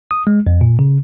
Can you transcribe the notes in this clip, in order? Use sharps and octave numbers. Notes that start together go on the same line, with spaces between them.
D#6
G#3
F2
A#2
C#3